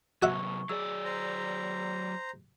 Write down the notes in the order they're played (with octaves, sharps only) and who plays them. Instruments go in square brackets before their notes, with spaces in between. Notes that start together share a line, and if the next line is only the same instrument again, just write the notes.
[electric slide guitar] C3 F#3 [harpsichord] F#4 E5 [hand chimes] C#6
[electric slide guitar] F#3 D5 [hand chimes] G#4 E6
[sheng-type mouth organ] C5 A#5